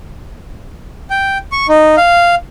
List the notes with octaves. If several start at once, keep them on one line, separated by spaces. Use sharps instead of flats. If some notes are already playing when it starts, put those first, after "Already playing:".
G5
C#6
D#4
F5